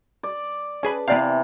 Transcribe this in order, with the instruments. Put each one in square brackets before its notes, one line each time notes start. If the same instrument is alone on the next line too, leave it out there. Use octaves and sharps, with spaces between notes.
[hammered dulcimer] D5
[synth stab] C#4 G#4 B4 [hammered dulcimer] A5
[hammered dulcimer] C3 E3 [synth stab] B3 D5 F5